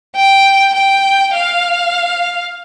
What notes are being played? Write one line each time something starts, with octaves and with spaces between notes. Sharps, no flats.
G5
G5
F5